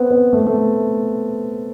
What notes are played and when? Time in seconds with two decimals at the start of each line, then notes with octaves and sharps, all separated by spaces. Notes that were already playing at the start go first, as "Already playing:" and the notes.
Already playing: B3 C4
0.10 B3
0.33 A3
0.39 B3
0.47 A3